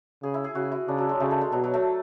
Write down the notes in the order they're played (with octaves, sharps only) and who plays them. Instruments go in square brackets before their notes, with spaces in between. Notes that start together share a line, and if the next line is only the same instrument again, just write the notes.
[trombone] C#3 [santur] G#4
[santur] E4
G#4
[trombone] C#3 [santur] F#4
[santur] E4
[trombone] C#3 [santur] D4
[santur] F#3
G#3
[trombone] C#3 [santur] A3
[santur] A3
G#3
[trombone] B2 [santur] F#3
[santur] F#3
A3